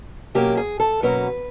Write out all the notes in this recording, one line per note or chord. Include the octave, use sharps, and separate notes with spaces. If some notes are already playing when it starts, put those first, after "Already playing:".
B2 F#3 A#3 C#4 G4
G#4
A4
B2 F#3 A#3 C#4 B4